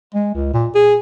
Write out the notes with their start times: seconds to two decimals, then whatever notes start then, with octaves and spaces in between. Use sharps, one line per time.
0.15 G#3
0.34 C#2
0.54 A#2
0.75 G#4